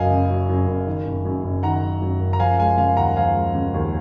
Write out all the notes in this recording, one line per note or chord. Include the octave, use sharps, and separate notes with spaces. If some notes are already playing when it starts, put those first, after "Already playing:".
Already playing: F#1 F#2 C#3 F#3 A#4 D#5 F5 G#5
C#3
F#3
F#2
F#1
D#3
F#1
F#2
F#1
D#3 F#5 A#5
F#1
F#2
F#1
A#5
F3 F5 G#5
G#3 F5 G#5
C#3 F5 G#5
D#2 F#5 A#5
F3 F5 G#5
G#3
C#3
D#2